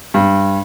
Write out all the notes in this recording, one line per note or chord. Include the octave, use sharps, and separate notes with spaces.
G2